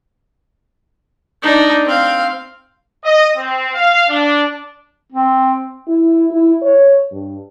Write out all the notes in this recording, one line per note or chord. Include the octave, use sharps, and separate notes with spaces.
D4 D#4
C4 F5
D#5
C4
F5
D4
C4
E4
E4
C#5
G2